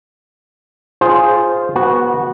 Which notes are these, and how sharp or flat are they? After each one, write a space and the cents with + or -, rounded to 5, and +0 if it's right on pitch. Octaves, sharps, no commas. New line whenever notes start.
F4 +0 G#4 +0 C5 -5
B3 -30 F#4 +0